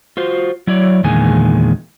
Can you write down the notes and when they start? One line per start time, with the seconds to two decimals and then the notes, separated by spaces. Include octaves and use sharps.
0.17 F4 F#4 C5
0.67 F#3 E4 C#5 D5
1.04 E2 A#2 D3 D#3 G#3 G#5